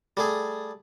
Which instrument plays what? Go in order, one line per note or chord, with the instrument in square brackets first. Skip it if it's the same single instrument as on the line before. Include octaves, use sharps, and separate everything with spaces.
[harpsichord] G3 A3 G#4